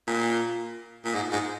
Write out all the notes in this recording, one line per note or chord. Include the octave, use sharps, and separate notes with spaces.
A#2
A#2
G#2
G#2